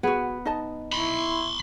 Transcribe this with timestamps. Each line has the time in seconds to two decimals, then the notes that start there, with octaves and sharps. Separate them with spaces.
0.03 B3 F#4 G#4
0.45 D#4 D#5 A5
0.93 E4 B5 C6